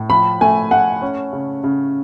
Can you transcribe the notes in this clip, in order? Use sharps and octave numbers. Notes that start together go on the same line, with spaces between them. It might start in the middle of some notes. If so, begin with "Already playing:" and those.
Already playing: A2
F3 B5
A3 G#5
A3 F#5
C#4
C#3
C#3